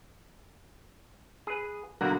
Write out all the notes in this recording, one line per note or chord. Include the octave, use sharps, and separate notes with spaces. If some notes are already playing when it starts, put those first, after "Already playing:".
G#4 B4
B2 D3 F#3 A#3 F#4 A#4